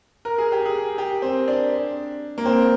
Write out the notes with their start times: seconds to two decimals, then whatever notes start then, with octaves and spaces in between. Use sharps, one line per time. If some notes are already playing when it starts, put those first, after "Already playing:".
0.25 A#4
0.38 G#4
0.52 G4
0.66 G#4
0.98 G4
1.22 C4
1.48 D4
2.38 A#3
2.46 C4